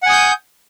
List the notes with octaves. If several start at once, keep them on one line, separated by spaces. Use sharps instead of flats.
F#5 G#5 D#6 G6